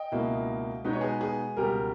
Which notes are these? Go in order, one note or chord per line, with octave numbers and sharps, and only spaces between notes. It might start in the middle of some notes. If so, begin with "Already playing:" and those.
Already playing: D#5 G5
C#2 B2 A#3 E4
B2 G#3 B3 D#4 B4
C#5
G#4 B4
G#4
C#2 B2 G3 G4 A#4